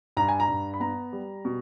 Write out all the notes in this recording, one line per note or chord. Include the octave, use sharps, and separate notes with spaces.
G2 A#5
G#5
A#5
G2
B5
B3 A#5
G3
B2